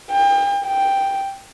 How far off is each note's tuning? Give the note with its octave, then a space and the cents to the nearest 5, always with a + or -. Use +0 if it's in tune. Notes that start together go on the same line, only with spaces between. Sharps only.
G5 +35
G5 +0